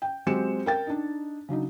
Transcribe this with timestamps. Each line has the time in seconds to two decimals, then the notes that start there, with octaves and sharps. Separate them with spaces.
0.02 G5
0.26 F#3 G#3 C4 G4 C#7 E7
0.66 A#4 G5 A6
0.87 D4 D#4
1.49 C#3 F#3 D4 D#4